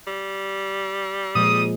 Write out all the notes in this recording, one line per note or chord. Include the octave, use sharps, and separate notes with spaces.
G3
A#2 F3 G#3 D#6